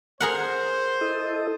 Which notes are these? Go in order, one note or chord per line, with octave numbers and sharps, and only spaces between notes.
G#4 A#4 C5 F#5
E4 A4 D#5